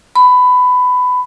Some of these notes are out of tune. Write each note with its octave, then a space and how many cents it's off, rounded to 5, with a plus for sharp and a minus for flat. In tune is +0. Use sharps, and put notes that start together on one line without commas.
B5 +15